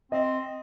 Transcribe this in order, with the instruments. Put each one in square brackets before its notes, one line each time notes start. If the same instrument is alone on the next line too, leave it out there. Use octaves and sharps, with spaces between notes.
[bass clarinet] C4 [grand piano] D#5